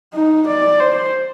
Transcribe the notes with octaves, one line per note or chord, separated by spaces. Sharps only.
D#4
D5
C5